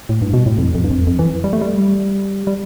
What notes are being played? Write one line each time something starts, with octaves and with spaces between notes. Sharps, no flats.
A2
G2
B2
A2
F2
F2
G2
F2
F2
E3
G3
A3
G3
G3